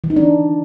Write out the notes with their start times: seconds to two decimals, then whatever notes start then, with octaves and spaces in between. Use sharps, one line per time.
0.04 E3
0.10 D#4
0.16 D4